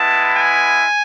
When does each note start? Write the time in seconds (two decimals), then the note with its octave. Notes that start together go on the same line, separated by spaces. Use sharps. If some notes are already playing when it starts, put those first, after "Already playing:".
Already playing: G#3 B3 E4 A5
0.35 G#5